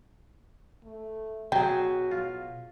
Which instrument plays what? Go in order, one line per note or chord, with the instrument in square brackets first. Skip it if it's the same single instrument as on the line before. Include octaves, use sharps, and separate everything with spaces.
[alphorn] A3
[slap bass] B2 [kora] F#3 G#4 [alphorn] F#4 [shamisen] G5
[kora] F4